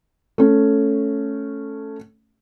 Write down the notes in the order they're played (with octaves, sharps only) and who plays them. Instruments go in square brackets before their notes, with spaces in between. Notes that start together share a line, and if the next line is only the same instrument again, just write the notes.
[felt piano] A3 C#4